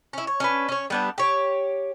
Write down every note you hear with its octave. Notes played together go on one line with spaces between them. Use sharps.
C#4 E4
C#5
C#4 D4 B4
C#4 C#5
G3 B3 D4
G4 C#5